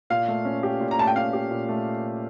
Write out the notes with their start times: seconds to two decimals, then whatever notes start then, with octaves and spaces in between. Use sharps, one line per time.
0.10 A#2 F5
0.28 A3
0.45 C#4
0.63 G4
0.80 A#2
0.91 A#5
0.98 A3 A5
1.07 G5
1.16 C#4 F5
1.33 G4
1.51 A#2
1.69 A3